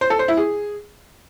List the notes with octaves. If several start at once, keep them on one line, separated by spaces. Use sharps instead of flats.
C5
A4
C5
E4
G#4